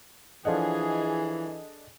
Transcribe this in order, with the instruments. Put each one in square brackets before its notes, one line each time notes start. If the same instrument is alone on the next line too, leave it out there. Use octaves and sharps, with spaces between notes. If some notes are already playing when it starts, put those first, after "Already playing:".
[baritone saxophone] E3 [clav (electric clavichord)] F3 F#5 [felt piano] D4 A4 D#5 [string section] G#4